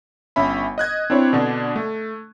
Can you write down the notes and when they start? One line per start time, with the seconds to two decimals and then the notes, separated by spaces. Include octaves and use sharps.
0.36 G1 C#4 E5 B5
0.78 D#5 F#6 G#6
1.10 C4 D4 E4 C#5
1.33 B2 D3 D4
1.76 A3